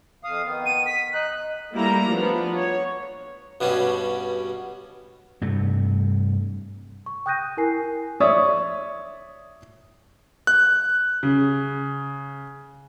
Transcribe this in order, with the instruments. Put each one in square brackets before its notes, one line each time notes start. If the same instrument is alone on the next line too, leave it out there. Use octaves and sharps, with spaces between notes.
[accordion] F2 F5 D#6
D#3 B3
[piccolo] D#7
B6
[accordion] D#4 [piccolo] F#6
[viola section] G3 A3 A#3 E4 A#5
F3 B3 D4
C#5
[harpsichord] G2 B2 G3 C#4
[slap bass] G2 C3 A3
[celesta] C#6
G5 D#6 F#6 G6 A#6 D#7
E4 A#4 G#5 C7
[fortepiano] C#5 D5 E5 C#6 D#6
[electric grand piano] F#6
[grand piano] C#3